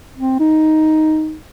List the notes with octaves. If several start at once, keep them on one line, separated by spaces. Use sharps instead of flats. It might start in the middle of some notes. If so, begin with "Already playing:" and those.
C4
D#4